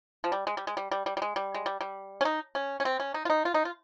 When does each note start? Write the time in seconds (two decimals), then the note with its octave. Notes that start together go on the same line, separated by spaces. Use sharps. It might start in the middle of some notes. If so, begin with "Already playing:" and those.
0.24 F3
0.32 G3
0.47 G#3
0.57 G3
0.67 G#3
0.77 G3
0.91 G3
1.06 G3
1.17 G3
1.22 G#3
1.36 G3
1.54 G#3
1.66 G3
1.81 G3
2.21 C#4
2.25 D#4
2.55 C#4
2.80 C#4
2.85 C4
3.00 C#4
3.14 D#4
3.25 F4
3.30 D#4
3.45 F4
3.54 D#4
3.65 F4